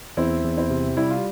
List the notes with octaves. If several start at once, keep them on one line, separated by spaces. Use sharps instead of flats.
E2 C4 E4
E2
C4 E4
C3
G3 E4
F4